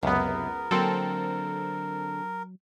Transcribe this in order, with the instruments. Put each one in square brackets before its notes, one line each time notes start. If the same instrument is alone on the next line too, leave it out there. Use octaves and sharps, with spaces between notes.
[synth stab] C#2 B3 [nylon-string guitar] F#2 C3 [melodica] A#4
[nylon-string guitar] D3 A#3 [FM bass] F#3 [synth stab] C4 A4